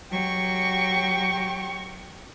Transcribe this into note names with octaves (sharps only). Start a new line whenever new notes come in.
F#3 G4 C#6